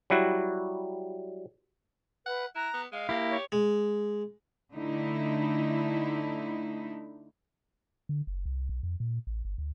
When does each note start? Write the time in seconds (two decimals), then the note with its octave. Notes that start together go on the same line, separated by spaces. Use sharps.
0.10 F#3 G3 E4 F#4
2.26 B4 F#5
2.55 E4 A#5 F#6
2.74 B3
2.92 G#3 D#5 F5
3.09 A#3 E4 G4 A#6
3.30 C#5
3.52 G#3
4.72 D3 A3 D#4 E4
8.09 D3
8.27 F#1
8.46 C2
8.69 B1
8.83 F2
9.00 A#2
9.27 A1
9.45 G1
9.58 D2